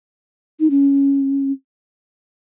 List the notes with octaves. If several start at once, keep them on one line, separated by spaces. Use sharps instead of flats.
D#4
C#4